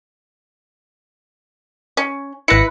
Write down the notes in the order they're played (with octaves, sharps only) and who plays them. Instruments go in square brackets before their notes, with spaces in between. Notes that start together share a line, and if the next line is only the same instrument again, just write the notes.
[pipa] C#4
[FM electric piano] G#1 A#6 C#7 [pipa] E4 B4